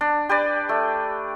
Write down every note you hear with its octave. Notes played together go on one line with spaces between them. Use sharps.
D4
G4 B4 D5
A3